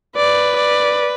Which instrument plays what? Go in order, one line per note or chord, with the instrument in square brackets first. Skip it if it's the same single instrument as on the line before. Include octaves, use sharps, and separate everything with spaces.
[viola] B4 [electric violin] D5
[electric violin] D5